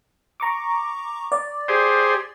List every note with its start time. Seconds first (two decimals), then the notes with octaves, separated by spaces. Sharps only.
0.40 A#5 C#6 D6
1.32 D5
1.68 G4 G#4 C5